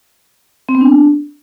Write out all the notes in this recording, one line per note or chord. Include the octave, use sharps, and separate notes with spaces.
C4
B3
D4